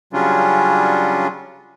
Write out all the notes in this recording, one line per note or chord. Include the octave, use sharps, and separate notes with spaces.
C#3 F#3 G3 C#4 D4 F4